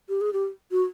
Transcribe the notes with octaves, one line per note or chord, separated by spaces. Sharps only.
G4
G#4
G4
F#4